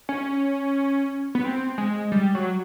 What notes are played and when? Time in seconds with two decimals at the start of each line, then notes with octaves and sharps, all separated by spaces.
0.09 C#4
1.35 B3
1.45 C4
1.78 G#3
2.12 G3
2.35 F#3